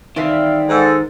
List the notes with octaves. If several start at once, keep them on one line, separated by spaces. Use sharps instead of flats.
D#3 E3 G3 C4 E5 F5
G#2 A4